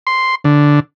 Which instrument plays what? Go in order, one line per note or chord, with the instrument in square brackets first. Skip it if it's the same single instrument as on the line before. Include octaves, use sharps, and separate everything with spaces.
[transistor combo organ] C6
D3